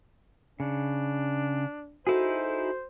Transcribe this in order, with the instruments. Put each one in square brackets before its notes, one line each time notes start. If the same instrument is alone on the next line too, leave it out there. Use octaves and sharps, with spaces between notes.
[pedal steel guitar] C#3 [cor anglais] D4
[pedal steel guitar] D#4 E4 G#4 [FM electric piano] F#4 A4 [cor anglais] C5